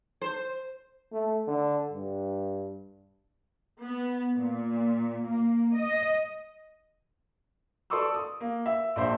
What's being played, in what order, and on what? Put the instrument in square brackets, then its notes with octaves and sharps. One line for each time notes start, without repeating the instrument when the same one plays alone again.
[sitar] C5
[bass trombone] A3
D3
G2
[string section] B3
A#2
A#3
D#5
[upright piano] A4 D5 C6 C#6 D#6 E6
D#6
A#3
E5
A#1 D4 C5 E5 C6